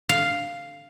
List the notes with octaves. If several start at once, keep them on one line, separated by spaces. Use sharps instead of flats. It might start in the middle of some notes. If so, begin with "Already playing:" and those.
F5